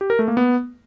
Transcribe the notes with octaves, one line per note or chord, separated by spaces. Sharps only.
G4
A#4
A3
A#3
B3